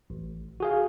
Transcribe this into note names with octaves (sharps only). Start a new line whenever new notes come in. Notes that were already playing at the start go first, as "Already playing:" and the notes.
A1
F#4 G#4 F5